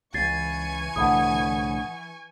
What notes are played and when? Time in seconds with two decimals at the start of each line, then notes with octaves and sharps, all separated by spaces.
0.14 C#2 E3 G#5 C#6 G#6 A6 C7
0.96 C2 A2 D3 F#5 B5 D#6